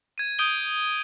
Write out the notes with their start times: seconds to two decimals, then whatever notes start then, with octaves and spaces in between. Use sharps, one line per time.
0.18 G#6 D#7
0.39 D#6 G6 D7 D#7 G7